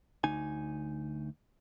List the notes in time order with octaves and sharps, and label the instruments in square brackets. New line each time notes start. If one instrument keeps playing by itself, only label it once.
[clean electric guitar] D2 D#4 G#5